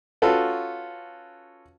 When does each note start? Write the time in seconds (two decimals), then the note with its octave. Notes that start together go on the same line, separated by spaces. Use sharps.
0.22 C#4 F4 F#4 A4 B4